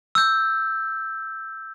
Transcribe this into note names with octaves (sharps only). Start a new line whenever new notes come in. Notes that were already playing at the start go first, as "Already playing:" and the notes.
E6 G6